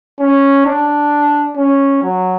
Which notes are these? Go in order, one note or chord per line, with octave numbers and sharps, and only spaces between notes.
C#4
D4
C#4
F#3